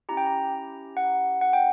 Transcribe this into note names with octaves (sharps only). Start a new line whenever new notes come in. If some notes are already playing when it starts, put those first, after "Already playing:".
C#4 E4 G4 A#5
G5
A#5
F#5
F#5
G5